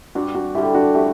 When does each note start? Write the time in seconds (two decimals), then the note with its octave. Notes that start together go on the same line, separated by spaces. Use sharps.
0.15 G2 D4 F#4
0.34 D4 F#4
0.55 D3 E4 G4
0.58 G3
0.75 D4 F#4
0.94 A3 E4 G4